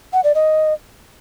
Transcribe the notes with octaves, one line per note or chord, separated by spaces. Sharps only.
F#5
D5
D#5